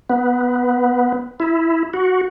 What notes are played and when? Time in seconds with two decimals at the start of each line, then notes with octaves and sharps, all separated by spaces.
0.10 B3
1.40 E4
1.94 F#4